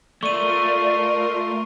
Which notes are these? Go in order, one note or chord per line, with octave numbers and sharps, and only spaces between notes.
A3 F4 A#4 D5 C6 C#6 D#7